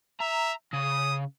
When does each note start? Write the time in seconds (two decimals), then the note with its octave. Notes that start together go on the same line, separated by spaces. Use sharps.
0.21 E5 A#5
0.73 C#3 D#6